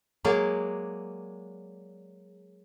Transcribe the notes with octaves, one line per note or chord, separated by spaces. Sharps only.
F#3 G#3 A#3 G#4 D5